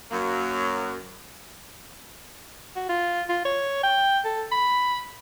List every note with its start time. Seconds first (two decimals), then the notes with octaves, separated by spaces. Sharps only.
0.11 F#2 F#3 A#3
2.76 F#4
2.89 F4
3.29 F4
3.45 C#5
3.83 G5
4.25 A4
4.52 B5